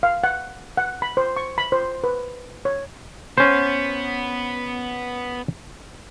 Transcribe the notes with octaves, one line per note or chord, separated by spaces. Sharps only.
F5
F#5
F#5
B5
C5
C#6
B5
C5
B4
C#5
B3 C#4 C5